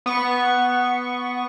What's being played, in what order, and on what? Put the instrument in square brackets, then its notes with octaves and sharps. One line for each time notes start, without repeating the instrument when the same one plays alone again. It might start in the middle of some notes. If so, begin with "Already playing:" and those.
[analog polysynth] B3 C#6